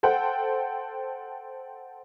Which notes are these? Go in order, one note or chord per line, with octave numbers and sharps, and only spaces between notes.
A4 C5 F#5 G5